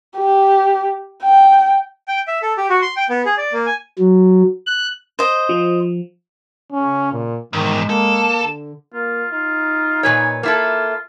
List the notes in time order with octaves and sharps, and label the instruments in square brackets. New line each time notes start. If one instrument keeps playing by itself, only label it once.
[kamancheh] G4
G5
[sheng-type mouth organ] G5
E5
A4
G4
F#4
C6
G5
B3
G#4
D5
A#3
G#5
[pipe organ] F#3
F#6
[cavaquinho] C5 D#5
[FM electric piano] F3
[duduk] C#3 [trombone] C#4
[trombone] A#2
[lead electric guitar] E2 G#2 [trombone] D#3 [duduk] G#3
[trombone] A#3 [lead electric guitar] A4
[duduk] D3
[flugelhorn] A#3 [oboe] F4
[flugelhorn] D#4 [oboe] F4
[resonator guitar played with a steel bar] A#2 B4 C#5 [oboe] G#5
[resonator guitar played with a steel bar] A#3 E4 A4 [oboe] F4